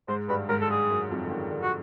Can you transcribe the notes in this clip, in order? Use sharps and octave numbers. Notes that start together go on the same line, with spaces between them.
G#2 G#3 C5
G2 G3 B4
G#2 G#3 A#4
A4
G2 G3 G#4
F#2 F#3
F2 F3
D3
D#3
D3
F#4